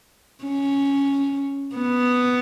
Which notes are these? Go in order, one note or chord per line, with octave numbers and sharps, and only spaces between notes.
C#4
B3